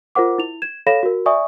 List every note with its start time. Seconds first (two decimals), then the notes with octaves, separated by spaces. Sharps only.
0.15 F4 A#4 C5 F#5 D6
0.38 E4 F7
0.62 G#6 E7
0.87 A4 C#5 F5 B5 A#6 E7
1.03 F#4 A#4
1.26 D5 E5 G#5 C#6 D#6